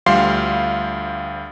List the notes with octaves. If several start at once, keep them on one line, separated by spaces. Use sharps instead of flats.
D2 F3 G3 F5 C6 C7